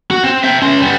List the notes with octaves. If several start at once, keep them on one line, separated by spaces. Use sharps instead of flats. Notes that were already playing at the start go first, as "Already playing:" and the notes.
F#4
C4 C5
E5 G5
C#4 C6
G3 B3